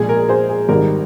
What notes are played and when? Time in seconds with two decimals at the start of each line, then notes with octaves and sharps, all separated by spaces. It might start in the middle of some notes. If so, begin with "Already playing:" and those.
Already playing: A#1 A#2 G#3 G#4
0.09 A#4
0.29 G#4 C5
0.49 G#4
0.69 G#1 G#2 D#3 G3 A#4